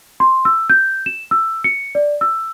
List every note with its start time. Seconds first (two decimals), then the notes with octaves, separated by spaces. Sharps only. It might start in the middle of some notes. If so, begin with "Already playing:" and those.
0.20 C6
0.45 E6
0.70 G6
1.06 E7
1.31 E6
1.64 C#7
1.95 D5
2.21 E6